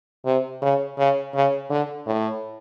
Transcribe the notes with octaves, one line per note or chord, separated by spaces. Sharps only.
C3
C#3
C#3
C#3
D3
A2